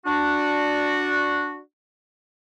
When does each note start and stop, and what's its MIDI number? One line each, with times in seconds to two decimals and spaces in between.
0.05 1.59 62
0.05 1.59 66